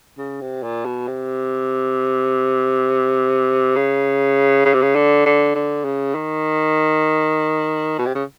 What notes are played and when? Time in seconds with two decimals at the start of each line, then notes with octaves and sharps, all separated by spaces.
0.18 C#3
0.41 C3
0.63 A#2
0.85 B2
1.08 C3
3.76 C#3
4.66 C#3
4.74 C3
4.82 C#3
4.96 D3
5.26 D3
5.56 D3
5.85 C#3
6.15 D#3
7.98 B2
8.06 C3
8.15 C#3